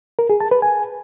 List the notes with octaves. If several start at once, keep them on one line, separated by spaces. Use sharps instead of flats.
A#4
G#4
A5
B4
G#5